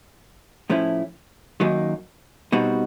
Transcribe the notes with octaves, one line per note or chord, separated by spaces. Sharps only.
A2 F3 A3 C#4 E4
F#2 D#3 F#3 A#3 D#4
B2 G3 C4 D#4 F#4